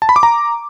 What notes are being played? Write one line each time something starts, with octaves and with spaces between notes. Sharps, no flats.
A5
B5
D6
A#5